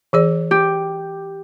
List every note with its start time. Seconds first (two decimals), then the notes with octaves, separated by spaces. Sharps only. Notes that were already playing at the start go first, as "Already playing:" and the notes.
0.13 E3 G#4 D5
0.51 G4